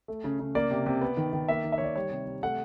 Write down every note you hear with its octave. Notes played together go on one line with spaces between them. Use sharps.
A3
C#3
C#3
A#3 D5
C3
C3
B3
D#3
D#3
A#3 E5
D#3
E5
C#5
D#3 D5
G3 C#5
C3
C3
A3 F#5